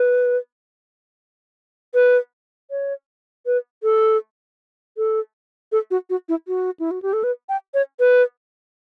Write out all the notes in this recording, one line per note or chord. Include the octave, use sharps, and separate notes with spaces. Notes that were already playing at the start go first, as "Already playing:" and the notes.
Already playing: B4
B4
C#5
B4
A4
A4
A4
F#4
F#4
E4
F#4
E4
F#4
G4
A4
B4
G5
C#5
B4